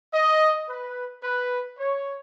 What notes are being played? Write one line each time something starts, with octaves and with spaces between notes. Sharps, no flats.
D#5
B4
B4
C#5